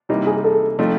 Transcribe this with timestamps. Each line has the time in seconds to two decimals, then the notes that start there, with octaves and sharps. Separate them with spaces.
0.09 C3 E3 G3 A#3 D#4
0.27 G#4
0.44 A4
0.79 F3 A3 C4 D#4